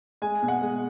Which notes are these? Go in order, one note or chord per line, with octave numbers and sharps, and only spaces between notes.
G#3 G#5
B2
F#5
G#3